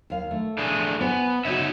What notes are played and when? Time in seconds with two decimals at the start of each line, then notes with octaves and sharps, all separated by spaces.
0.10 D#2 F5
0.31 A3
0.58 A2 D4 G#4
1.01 B3 C5 G#5
1.45 C#3 D#4 F#4 C#5 E5